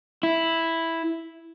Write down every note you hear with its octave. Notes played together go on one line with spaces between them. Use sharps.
E4